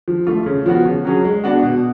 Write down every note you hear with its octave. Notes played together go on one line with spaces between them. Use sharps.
F3
A3 F4
C#3
F3 B3 F#4
C#3
F#3 C#4 G#4
G#3
B3 D4 F#4
B2